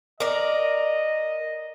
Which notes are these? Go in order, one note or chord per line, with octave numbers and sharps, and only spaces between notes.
A#4 D5 D#5